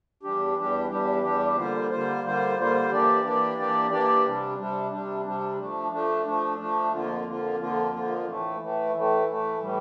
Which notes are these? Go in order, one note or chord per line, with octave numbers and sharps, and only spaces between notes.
E2 E3 G3 D4 G4
E2 E3 G3 D4 G4
E2 E3 G3 D4 G4
E2 E3 G3 D4 G4
D3 G3 A#3 F4 C5
D3 G3 A#3 F4 C5
D3 G3 A#3 F4 C5
D3 G3 A#3 F4 C5
E3 A#3 D4 G4 D5
E3 A#3 D4 G4 D5
E3 A#3 D4 G4 D5
E3 A#3 D4 G4 D5
C3 G3 D4
C3 G3 D4
C3 G3 D4
C3 G3 D4
F3 A3 D4
F3 A3 D4
F3 A3 D4
F3 A3 D4
F2 D3 F3 A#3 F4
F2 D3 F3 A#3 F4
F2 D3 F3 A#3 F4
F2 D3 F3 A#3 F4
A2 E3 A3
A2 E3 A3
A2 E3 A3
A2 E3 A3
A2 E3 G3